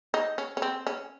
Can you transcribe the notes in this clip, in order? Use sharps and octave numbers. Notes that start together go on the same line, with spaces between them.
D#4
C#4
C#4
C4
C#4